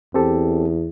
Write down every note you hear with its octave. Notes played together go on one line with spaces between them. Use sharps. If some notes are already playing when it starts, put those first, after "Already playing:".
E2 C4 G4 A4